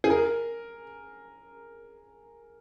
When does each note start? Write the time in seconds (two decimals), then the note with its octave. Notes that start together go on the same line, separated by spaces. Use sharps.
0.04 G#4
0.10 A#4